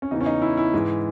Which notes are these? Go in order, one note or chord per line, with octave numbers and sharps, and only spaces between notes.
C#4
E2 C#3 E3 D#4
C#4
D#4
E4
E4
G#2 E3